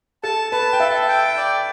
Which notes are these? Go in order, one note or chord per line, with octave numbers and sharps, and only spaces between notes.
A4 A5
B4 A5
G5
A4 E5
G5
D5